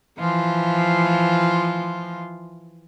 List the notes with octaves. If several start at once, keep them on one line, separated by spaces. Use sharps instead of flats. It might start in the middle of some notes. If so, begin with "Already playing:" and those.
E3 F3 F4